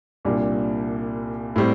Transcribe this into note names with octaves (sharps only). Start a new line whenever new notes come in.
C2 A#2 G3 D4
A2 G3 C4